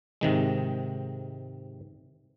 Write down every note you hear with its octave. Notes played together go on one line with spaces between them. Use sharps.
G#2 C3 D#3 G#3